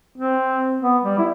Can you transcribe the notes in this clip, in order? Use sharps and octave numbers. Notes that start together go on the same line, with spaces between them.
C4
B3
G3
E4